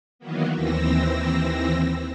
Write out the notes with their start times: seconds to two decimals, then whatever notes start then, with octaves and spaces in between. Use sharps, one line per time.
0.19 D#3 E3 F#3 A#3 B3
0.52 D#2 E3 C4 E6 A#6